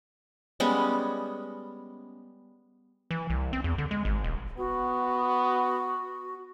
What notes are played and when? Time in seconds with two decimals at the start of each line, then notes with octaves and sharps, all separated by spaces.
0.60 G3 G#3 B3 C#4
3.11 E3
3.30 C2
3.53 C4
3.64 E2
3.78 D3
3.91 G#3
4.05 G#1
4.24 D#1
4.58 B3 F#4